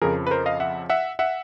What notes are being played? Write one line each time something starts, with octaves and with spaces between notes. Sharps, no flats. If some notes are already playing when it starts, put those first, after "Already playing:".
F2 C#3 F3 G#4 A#4
B4
A#4 C5
D#5 F5
E5 F#5
E5 F#5
E5 F#5